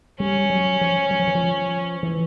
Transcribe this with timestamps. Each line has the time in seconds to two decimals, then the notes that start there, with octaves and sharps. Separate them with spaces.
0.19 G3 C#4
0.50 F#3
0.81 F3
1.11 F#3
1.19 F3
1.27 E3
1.35 F3
2.03 E3